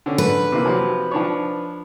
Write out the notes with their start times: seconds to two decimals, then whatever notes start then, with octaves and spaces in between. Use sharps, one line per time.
0.06 D3 C#4
0.18 B4
0.52 C3 E3 A#3
0.65 C3 F3 F#3
1.11 F3 D4 C#5